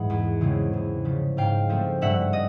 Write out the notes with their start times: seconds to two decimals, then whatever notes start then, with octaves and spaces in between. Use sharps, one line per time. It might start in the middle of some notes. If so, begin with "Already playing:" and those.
Already playing: G#2 E3 G#3 B3 F#5
0.10 E2
0.41 C#3 E3 G#3 C4
0.73 E2
1.05 C#3 F3
1.37 G#2 F5 G5
1.69 F3 A3 C4
2.01 G2 E5 F#5
2.33 D#5